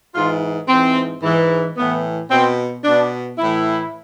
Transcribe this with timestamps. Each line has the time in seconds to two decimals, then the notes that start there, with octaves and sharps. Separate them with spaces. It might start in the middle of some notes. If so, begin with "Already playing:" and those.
0.15 G#2 E3 F4
0.68 G#2 E3 C4
1.22 G#2 E3
1.76 A2 E3 B3
2.30 B2 C4
2.84 B2 D4
3.38 A2 E3 E4